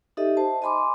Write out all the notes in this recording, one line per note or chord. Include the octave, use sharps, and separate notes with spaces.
D#4 G4 A4 D#5 E5
C5 A5
D#5 G#5 B5 C6 D6